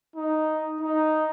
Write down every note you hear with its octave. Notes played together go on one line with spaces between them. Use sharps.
D#4
D#4